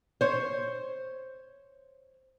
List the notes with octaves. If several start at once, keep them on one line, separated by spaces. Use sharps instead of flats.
C5 C#5